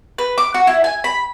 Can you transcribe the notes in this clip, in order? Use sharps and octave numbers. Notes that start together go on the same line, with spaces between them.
B4
D6
F#4
E4
G#5
B5